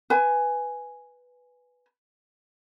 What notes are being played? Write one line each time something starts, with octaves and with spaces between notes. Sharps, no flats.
B4 G#5